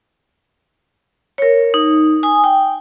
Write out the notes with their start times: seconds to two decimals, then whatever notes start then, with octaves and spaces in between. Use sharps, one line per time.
1.38 A#4 C#5
1.74 D#4
2.23 G#5 D#6
2.44 G5